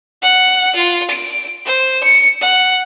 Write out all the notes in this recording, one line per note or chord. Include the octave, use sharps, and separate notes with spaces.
F#5
F4
D7
C5
C#7
F#5